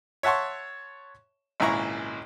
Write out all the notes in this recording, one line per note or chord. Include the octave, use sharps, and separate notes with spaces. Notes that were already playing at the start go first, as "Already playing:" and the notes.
C#5 E5 F#5 A5 C6 C#6
G#1 C#2 A#2 E4 A#5 C#6